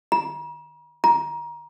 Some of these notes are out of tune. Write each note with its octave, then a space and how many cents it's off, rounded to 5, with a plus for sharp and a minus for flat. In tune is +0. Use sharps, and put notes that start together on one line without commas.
A#5 +45
A#5 +25